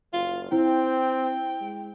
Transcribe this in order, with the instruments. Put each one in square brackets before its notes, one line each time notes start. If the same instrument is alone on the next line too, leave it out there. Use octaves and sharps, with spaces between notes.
[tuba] F#1 [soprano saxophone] F4
[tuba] C4 [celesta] E4 [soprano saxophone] G5
[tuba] G#3